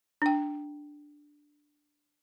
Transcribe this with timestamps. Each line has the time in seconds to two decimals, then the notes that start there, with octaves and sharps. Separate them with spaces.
0.22 D4 G5